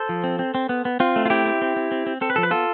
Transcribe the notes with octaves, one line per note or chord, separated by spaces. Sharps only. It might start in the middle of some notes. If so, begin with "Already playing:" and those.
Already playing: A4 C5
F3
C4
C4
C4
B3
B3
C4 F4
A3
F4
C4 E4 G4
C4
C4
C4
C4
C4
C4 A4
B4
F3 A4
B4
B3 F4 A4